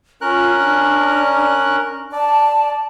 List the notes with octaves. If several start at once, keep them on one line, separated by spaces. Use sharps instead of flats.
C#4 F4 A#4 F#6
D4
D5 A5